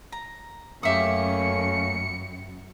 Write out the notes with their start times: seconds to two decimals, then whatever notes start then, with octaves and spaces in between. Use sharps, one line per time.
0.12 A#5
0.83 F#2 A3 A#3 C#4 G4 E5 D#6 C#7